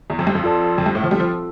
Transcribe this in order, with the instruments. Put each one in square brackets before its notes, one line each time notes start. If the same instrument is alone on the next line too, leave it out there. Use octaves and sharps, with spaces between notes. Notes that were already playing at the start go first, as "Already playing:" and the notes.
[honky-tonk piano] E2
F2
G2
F2
[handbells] F4 A4 D5 A5
[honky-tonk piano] F2
G2
A2
F3
[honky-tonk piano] G3 [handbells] C4 F4 A4
[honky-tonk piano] F3